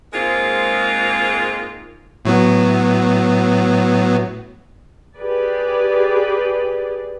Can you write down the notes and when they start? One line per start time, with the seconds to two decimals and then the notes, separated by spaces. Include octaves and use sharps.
0.13 G#2 G#3 A#3 C4 F4
2.25 A2 F#3 B3
5.17 G4 G#4 B4 D5